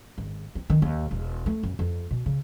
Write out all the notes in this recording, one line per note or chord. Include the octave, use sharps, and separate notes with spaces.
G#1
C4
D#3
D#2
E1
A3
F#2
F2
B2
C#3